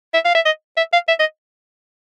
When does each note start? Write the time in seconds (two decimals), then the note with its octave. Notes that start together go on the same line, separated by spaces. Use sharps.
0.14 E5
0.25 F5
0.35 E5
0.45 D#5
0.77 E5
0.93 F5
1.08 E5
1.20 D#5